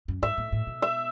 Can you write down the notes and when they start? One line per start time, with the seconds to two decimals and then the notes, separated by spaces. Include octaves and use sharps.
0.08 F#2
0.22 G#2 E5
0.38 A2
0.52 A2
0.67 B2
0.82 E5